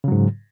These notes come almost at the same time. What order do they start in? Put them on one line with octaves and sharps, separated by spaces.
C#3 F#3 G#2